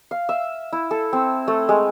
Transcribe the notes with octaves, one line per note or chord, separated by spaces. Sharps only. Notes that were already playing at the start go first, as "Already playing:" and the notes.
F5
E5
E4
A4
C4
A3
G#3